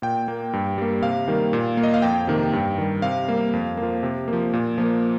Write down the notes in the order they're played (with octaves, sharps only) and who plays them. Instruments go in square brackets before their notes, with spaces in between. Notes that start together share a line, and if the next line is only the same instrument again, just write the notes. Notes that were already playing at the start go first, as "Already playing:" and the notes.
[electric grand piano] A#2 G5
A#3
G2
G3 A#3
C3 F5
D#3 G3 A#3
A#2
A#3
D#5
F5
F2 G5
C3 D#3 A#3
G2
D#3 G3
C3 F5
G3 A#3
F2
F3 A#3
C3
F3 A#3
A#2
F3 A#3